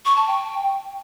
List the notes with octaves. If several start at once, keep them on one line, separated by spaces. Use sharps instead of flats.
C#6
A5
G5